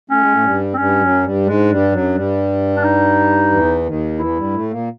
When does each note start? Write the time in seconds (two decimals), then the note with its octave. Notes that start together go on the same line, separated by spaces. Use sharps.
0.10 A3 C#4
0.22 G#3
0.32 A2 A3
0.44 G2 G3
0.74 C4
0.78 G2 G3 C#4
1.01 F#2 F#3
1.23 G2 G3
1.46 G#2 G#3 D4
1.69 G2 G3
1.92 F#2 F#3
2.15 G2 G3
2.77 D4
2.83 D#4
3.51 E2 E3
3.86 D#2 D#3
4.19 E2 E3 E4
4.37 G2 G3
4.54 A2 A3
4.71 A#2 A#3